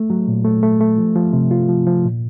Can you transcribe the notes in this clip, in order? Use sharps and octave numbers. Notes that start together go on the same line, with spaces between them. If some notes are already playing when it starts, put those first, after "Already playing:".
Already playing: A3
F#3
A#2
A3
A3
A3
F3
F3
C3
F4
F3
F3
A#2